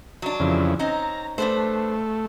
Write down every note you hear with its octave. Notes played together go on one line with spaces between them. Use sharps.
F#3 D4
F2 C#3 E3
C4 C#4 D#4 A#5
A3 D4 B4 C5